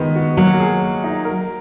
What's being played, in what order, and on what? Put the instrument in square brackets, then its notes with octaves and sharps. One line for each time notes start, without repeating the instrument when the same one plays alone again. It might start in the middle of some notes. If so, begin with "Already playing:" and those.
Already playing: [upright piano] D#3 G#3 B3
F#4
[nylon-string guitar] F#3 [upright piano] A#3
[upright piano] G#4
A#3
D#4
A#4